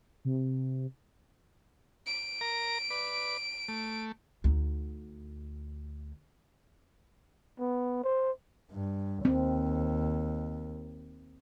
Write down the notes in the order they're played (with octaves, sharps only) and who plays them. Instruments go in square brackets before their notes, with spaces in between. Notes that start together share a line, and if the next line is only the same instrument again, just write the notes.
[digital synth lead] C3
[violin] D7
[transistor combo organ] A#4 A#5
B4 D5
A3
[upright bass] D2 D#4
[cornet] B3
C5
[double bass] G2
[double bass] D#2 [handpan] C4